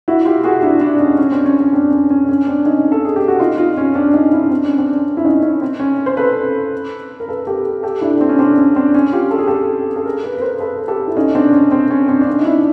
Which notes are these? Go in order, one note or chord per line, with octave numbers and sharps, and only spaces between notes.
E4 F#4
F4 G4
F#4 G#4
D4 E4
D4 E4
C#4 D#4
C#4
C4 D4
C#4
C#4
C4 D4
C#4
C#4
D4
C#4
C4 D4
C#4 D#4
A4
G#4
G4
F#4
D#4 F4
D#4 F4
C#4
C4 D4
C#4 D#4
D4 E4
C4 D4
C#4
C4 D4
C#4
E4
C#4 D#4
C#4
C4
C#4
C5
A4 B4
A#4
A4 B4
G4 A4
G4 A4
D4 E4
C4 D4
C#4
C4 D4
C#4
C4 D4
C#4
F4 G4
A4
G#4
G4 A4
A4
G#4 A#4
A4 B4
B4
A#4 C5
A4 B4
G4 A4
E4
C#4 D#4
C4 D4
C#4
C4
C#4
C4 D4
D4
C#4 D#4
D#4
D4 E4